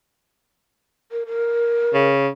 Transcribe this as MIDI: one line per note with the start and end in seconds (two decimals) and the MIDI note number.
1.11 1.24 70
1.26 2.08 70
1.94 2.28 49